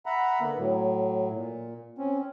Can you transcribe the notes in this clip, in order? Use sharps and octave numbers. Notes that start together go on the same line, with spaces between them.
E5 F#5 A#5 B5
D3 A#3 B3
A2 F#3
A#2
C4 C#4